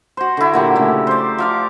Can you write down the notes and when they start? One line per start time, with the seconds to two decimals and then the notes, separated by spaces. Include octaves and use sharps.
0.17 F#4 C5
0.37 D3 E4
0.54 A#2 F#3 G4
0.76 C#3 A3
1.07 C5 D5
1.38 F3 F5 D6